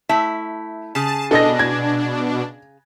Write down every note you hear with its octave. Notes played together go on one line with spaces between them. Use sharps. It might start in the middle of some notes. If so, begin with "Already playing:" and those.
A3 E4 E5
C#3 G#4 A5
B2 D4 A4 D#5 A#6
G#6